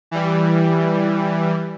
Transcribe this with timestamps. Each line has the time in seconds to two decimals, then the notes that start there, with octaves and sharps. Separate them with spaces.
0.11 E3 G3